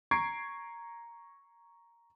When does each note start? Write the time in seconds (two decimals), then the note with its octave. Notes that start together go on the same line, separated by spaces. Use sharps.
0.11 A#5 C#6 G#6 C7 D7